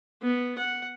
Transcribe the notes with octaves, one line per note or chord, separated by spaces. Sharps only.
B3
F#5